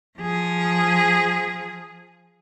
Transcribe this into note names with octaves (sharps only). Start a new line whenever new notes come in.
F3 G#4